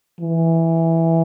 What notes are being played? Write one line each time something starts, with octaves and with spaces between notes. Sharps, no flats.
E3